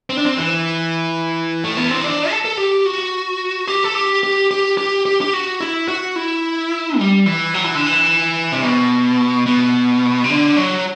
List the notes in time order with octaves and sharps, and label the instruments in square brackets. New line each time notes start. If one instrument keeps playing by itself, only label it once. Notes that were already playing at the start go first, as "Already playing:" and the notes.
[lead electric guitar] C4
D4
C4
E3
A3
B3
C4
D4
A4
A4
G4
F#4
G4
A4
G4
G4
G4
G4
G4
G4
F#4
E4
F#4
E4
G3
E3
F#3
E3
D3
E3
C3
B2
B2
C3
D3
F#3